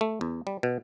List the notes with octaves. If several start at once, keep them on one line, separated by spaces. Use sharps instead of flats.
A3
E2
G3
B2